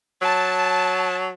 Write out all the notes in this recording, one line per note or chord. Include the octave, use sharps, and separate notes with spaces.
F#3 A5